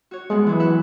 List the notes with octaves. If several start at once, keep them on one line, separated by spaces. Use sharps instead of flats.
F#4 C#5
G2 G#3 B3 F#5
E3 F#3 A3
E5 F#5